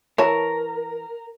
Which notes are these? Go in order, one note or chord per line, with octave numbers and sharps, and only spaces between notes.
E3 A#4 C#5 A5